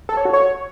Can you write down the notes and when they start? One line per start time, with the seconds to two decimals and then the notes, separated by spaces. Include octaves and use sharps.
0.09 A4
0.17 C#5
0.25 F#4
0.33 C#5